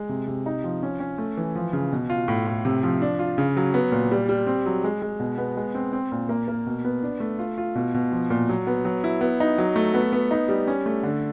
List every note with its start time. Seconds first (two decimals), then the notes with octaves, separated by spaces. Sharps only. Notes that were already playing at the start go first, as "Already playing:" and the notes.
Already playing: G#3
0.09 C3
0.28 C3
0.46 D#4
0.64 F3
0.83 C#4
1.00 C#4
1.18 A3
1.37 E3
1.55 F3
1.73 C#3
1.92 B2
2.10 F4
2.28 A2
2.47 A2
2.65 C3
2.83 F3
3.02 D4
3.19 F4
3.38 C#3
3.57 F#3
3.74 B3
3.92 A#2
4.11 G3
4.29 G3
4.47 C4
4.66 F#3
4.84 G#3
5.02 G#3
5.20 B2
5.38 B3
5.57 G#3
5.75 C4
5.93 C4
6.12 A#2
6.29 A#3
6.48 A#3
6.67 B2
6.85 B3
7.03 D4
7.20 A3
7.39 F4
7.58 F4
7.75 B2
7.94 B2
8.12 F3
8.30 A#2
8.49 F#3
8.67 B3
8.85 F#3
9.04 E4
9.21 B3
9.40 D#4
9.58 F#3
9.76 A3
9.94 B3
10.13 B3
10.31 D#4
10.49 G3
10.67 C#4
10.86 A3
11.03 D3